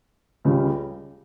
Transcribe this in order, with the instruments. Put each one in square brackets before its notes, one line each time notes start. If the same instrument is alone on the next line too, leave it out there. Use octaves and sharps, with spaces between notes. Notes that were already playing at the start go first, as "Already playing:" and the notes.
[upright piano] C#2 C#3 G3